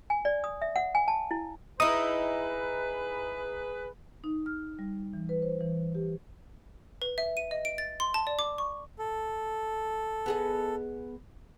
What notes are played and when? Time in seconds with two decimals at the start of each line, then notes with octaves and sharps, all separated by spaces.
0.10 G#5
0.25 D5
0.44 D#6
0.62 E5
0.76 F#5
0.95 G#5
1.08 A5
1.31 E4
1.80 D#4 E4 G#4 B4 D#6
4.24 D#4
4.46 F6
4.79 G3
5.14 E3
5.29 B4
5.42 C5
5.60 E3
5.95 G4
7.02 B4
7.18 E5
7.37 D#7
7.51 D#5
7.65 D7
7.78 A6
8.00 C6
8.14 A5
8.27 D5
8.39 D6
8.58 C#6
8.99 A4
10.26 B3 G#4 D#5